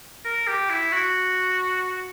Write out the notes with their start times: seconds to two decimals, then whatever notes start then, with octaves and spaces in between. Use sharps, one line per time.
0.25 A#4
0.47 G4
0.70 E4
0.93 F#4